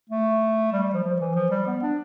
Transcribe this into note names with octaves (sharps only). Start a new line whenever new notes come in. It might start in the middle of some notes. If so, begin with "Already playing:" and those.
A3
G3
G3
F3
F3
E3
F3
G3
B3
D4